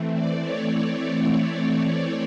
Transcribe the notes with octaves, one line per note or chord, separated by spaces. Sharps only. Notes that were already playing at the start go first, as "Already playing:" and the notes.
Already playing: E3 A3 C4
D5
C#5
C#5
C#5
D5